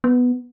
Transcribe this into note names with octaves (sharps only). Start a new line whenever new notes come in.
B3